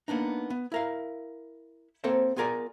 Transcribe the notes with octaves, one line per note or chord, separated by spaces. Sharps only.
A#3 B3 D4 D#4
B3
E4 A#4 F5
A#3 C4 A4 A#4 C5 C#5
B3 F4 G#4 A#4 D5 G#5